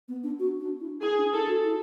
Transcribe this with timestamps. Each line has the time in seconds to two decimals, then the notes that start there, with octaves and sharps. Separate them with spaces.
0.08 B3
0.23 D4
0.39 F#4
0.60 D4
0.81 E4
1.02 E4 G#4
1.18 D4
1.33 E4 A4
1.48 F#4
1.64 E4